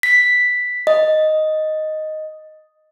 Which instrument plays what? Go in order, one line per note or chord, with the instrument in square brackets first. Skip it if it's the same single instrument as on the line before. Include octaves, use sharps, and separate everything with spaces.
[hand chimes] B6
D#5